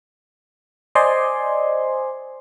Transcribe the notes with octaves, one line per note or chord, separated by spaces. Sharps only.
C5 D5 D#5 G#5 C6